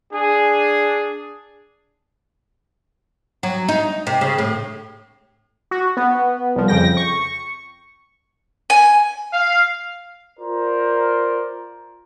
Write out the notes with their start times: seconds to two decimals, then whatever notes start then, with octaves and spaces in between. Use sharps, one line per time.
0.13 D4 G#4
3.43 F#3
3.68 D#4
4.07 C3
4.21 C#3
4.38 A2
5.71 F#4
5.97 B3
6.56 C2 F3
6.68 F2 C#3 G5 A#6
6.97 C#6
8.70 G#5
9.33 F5
10.39 F4 A#4 C5 D5